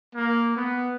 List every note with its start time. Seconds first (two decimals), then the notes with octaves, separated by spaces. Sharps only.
0.15 A#3
0.56 B3